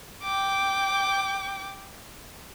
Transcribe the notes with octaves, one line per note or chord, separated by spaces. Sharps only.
G5 D6